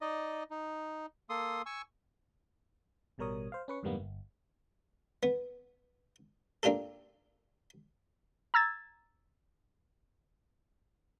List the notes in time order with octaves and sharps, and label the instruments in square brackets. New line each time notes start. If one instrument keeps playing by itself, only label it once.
[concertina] D#4 D5 D#5
D#4
A#3 A4 C6 D#6
G#5 C#6 E6
[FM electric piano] A1 B2 G3 A#4 C#5 D#6
C5 F5
C#4 B4 C#6
F2 G#2 D3 G3 A#3 B3
G1
[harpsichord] B3
A#3 D4 F4 G4 A4
[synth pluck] A#5 E6 G#6 A6